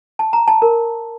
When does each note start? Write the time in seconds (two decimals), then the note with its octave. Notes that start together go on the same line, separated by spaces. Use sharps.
0.19 A5
0.33 A#5
0.48 A5
0.62 A#4